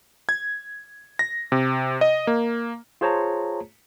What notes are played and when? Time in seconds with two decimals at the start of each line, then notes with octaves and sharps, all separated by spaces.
0.29 G#6
1.19 A#6
1.52 C3
2.01 D#5
2.27 A#3
3.01 F4 G#4 C5 C#5 A5 A#5